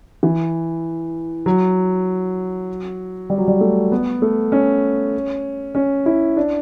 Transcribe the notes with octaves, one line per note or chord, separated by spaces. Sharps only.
E3
F#3
G3
F#3
G3
A3
B3
A3
C#4
C#4
E4
D4